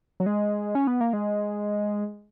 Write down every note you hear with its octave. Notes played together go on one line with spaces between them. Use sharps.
F#3
G#3
C#4
B3
A#3
G#3